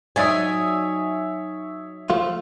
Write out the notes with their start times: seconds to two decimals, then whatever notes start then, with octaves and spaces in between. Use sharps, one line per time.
0.16 F#3 D#4 C#5 D5 E5 G#5 D#6
2.10 F3 A3 F4